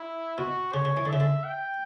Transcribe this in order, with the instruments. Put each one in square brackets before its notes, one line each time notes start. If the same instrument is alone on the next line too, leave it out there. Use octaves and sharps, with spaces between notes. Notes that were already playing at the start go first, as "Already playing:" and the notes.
Already playing: [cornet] E4
[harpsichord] B2 [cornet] F#4
[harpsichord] C#3 [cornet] C#5
[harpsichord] C#3
E3
D3
[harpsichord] C#3 [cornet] E5
[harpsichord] D3
[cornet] G5